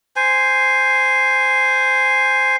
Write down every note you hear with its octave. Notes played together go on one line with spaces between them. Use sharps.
C5 G#5